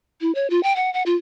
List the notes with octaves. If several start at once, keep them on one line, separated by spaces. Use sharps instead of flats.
E4
C#5
F4
G5
F#5
F#5
F4